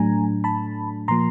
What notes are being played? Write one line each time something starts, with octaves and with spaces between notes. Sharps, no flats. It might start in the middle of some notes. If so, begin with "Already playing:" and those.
Already playing: A2 F#3 A3 D4 G#5 A#5
A5 B5
A#2 F3 A#3 A#5 C6